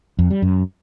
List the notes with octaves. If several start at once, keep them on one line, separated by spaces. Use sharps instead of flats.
F2
G3
F#2